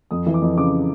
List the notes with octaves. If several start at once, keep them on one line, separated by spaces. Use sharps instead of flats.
F2 D#6
E3
D6
F2
C#3 D6